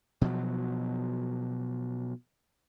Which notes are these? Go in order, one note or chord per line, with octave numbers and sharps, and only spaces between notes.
B2 F3 F#3